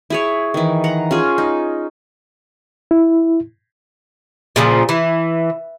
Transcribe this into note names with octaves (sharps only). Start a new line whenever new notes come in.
E4 G#4 C#5
D#3 E3
F#5 A#5
C#4 F4 G#4
D#4
E4
A#2 C#3 F3
E3